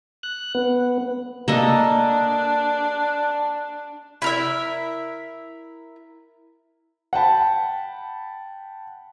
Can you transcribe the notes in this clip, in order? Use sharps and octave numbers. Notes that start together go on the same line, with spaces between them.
F#6
B3
A#3 D4 A4 D#5
E4 A#4 E5
F#5 G5 A5 B5